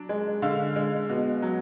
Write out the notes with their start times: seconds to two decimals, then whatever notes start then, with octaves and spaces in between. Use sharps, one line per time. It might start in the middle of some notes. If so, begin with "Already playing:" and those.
Already playing: F#3 D4
0.09 G#3
0.42 D3 F5
0.76 G#3
1.09 B2
1.42 F#3